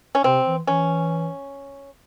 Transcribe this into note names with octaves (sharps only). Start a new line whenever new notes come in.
C#4
C3 C4
E3
E3 C#4